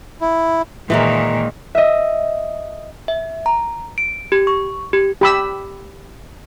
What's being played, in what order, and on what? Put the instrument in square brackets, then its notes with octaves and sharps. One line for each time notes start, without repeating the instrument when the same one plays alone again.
[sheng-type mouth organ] E4
[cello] A#2 D#3 [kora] E3 G#3 A#3
[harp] D#5 E5
[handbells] E5
A#5
D7
G4
C#6
G4
[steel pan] G4 B5 E6